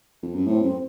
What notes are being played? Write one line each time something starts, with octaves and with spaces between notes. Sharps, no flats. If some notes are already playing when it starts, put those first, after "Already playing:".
F2
F#2
A2 C4
F#2 C4